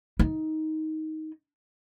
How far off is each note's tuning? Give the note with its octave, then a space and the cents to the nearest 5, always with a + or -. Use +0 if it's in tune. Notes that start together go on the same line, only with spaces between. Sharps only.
D#4 +15